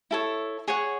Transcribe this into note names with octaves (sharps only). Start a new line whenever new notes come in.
E4 A4 C#5
G#4 C#5 F#5